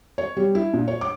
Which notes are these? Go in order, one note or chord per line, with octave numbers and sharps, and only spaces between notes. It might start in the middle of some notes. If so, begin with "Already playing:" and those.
C#5
G3
E4
A#2
C#5
D6